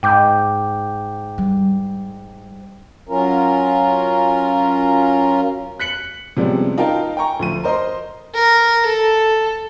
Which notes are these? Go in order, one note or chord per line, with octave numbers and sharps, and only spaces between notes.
G#2 G5 D6 G6
G3
F#3 C#4 F4 A#4
F#6 B6 C#7 F#7
C3 F3 G3 G#3 B3 C#4
D#4 F4 A#4 F5 G5 A5
G5 G#5 A#5 C#6
D2 F3 D#7
A#4 C5 D#5 A#5 C6
A#4
A4